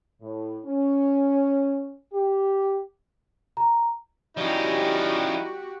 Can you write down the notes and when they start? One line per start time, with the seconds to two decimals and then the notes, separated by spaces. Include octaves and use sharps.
0.22 A2
0.65 C#4
2.13 G4
3.57 A#5
4.37 F3 G3 C#4 D#4 E4 F#4 G4